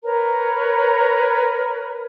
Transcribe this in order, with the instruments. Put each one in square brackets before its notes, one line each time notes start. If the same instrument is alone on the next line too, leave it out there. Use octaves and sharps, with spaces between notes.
[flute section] A#4 B4 C#5 A#5